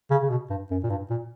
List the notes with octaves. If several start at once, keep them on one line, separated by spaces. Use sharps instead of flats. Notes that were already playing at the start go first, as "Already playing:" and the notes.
C#3
C#3
B2
G2
F#2
A#2
G2
A#2